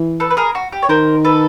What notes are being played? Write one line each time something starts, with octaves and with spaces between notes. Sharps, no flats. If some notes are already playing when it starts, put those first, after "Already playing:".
Already playing: E3
A4 B4
B4
G#4 A#4
F#4
G4
C#5
D#3 A#4 C5
A4 B4